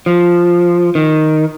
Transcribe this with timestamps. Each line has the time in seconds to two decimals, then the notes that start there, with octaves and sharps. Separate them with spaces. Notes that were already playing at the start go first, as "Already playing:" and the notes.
0.06 F3
0.95 D#3